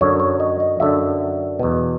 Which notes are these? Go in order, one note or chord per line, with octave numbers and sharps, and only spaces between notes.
F#2 D3 C#5
C#5
D#5
D#5
F#2 D3 E5
E2 B2